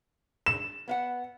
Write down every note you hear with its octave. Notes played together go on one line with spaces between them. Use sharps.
E7
B3 F5 F#5